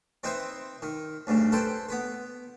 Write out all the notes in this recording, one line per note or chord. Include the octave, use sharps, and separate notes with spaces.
C4 D#4 B4 C5 E5
D#3
D2 G2 C#3
A4 B4 C5 G5
B3 B4